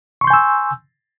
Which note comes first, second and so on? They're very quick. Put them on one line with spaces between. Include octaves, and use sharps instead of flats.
C#6 C6 G6 G#5 E6